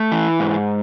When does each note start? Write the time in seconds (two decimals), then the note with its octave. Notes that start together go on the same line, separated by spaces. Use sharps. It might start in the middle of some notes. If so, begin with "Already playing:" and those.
Already playing: A3
0.12 E3
0.40 G#2